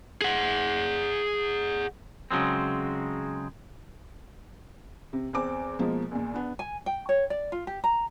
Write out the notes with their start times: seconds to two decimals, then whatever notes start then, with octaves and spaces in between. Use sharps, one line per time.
0.22 G#4 F#5
2.31 C#3 F#3 G#3 C4
5.13 C3
5.33 E2 C4 D6
5.79 B2 F3 G#3 A#3
6.11 E2 A#2
6.34 B3 D4
6.59 G#5
6.86 G5
7.09 C#5
7.30 D5
7.52 F4
7.67 G4
7.84 A#5